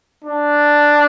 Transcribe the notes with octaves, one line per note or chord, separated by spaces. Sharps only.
D4